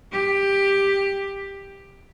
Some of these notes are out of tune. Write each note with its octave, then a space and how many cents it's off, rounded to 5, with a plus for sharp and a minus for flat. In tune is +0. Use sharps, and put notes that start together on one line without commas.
G4 +10